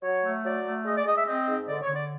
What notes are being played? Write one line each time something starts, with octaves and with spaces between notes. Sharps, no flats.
F#3 C#5
A3
F#3 D5
A3
G#3 D#5
D5
G#3 D#5
E5
C4 D#5
G#2
D3 D5
C#5
D3
D5